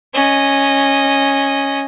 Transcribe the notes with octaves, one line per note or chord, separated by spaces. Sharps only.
C#4 D#5